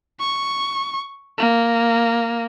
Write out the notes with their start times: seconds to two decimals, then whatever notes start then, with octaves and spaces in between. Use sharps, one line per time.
0.20 C#6
1.38 A#3